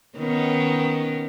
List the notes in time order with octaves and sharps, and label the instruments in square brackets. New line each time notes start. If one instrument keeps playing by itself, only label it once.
[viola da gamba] D#3 B3 C#4